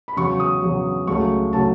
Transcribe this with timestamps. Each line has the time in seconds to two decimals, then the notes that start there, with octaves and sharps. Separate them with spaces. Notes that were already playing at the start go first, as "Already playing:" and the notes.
0.08 B5
0.17 E2 C#3 F#3 C#6
0.40 D#6
0.62 E2 C#3 F#3
1.07 C#2 C#3 F#3 A3 C#6
1.53 C#3 F#3 A3 A5